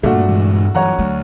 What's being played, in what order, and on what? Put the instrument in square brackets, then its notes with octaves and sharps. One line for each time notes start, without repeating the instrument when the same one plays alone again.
[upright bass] G2 [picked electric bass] A#2 A#3 [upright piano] A3 D4 F#4
[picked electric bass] A#2 E3 G#3
[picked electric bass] G2 E3 F#3 [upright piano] C#5 F#5 A#5
[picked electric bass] D2 [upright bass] F#3